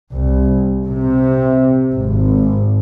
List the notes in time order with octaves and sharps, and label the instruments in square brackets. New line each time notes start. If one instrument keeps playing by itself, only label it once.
[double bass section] C2
C3
G#1